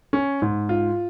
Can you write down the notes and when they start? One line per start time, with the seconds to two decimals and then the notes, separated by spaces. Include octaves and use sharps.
0.13 C#4
0.42 G#2
0.69 F4